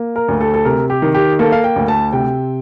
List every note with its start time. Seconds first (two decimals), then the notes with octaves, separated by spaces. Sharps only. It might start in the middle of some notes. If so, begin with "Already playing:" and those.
Already playing: A#3
0.16 A#4
0.28 D2
0.41 A4
0.54 A4
0.65 C3 A#4
0.90 G4
1.02 D#3
1.15 G4
1.39 A#3 A4
1.52 F5
1.64 G5
1.76 D2
1.88 A5
2.13 C3 G5